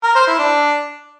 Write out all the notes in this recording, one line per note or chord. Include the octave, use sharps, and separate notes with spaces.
A#4
C5
E4
D4